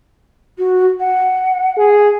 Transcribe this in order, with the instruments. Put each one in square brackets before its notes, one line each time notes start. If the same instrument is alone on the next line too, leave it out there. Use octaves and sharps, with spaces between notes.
[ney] F#4
F#5
[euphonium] G#4